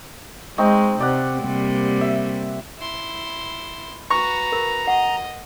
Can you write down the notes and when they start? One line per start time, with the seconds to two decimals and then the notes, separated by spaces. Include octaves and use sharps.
0.58 G#3 C4 D#4 C#6
1.00 C3 D5 F#5
1.40 C3 G3 A#3
2.01 E5
2.79 E4 C6
4.10 F#4 B4 A#5 C#6
4.52 A#4
4.87 D#5 F#5